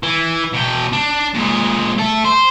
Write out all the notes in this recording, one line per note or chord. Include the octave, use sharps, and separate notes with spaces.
E3
B2 G5
D4
A#2 G#3
A3 A4
C5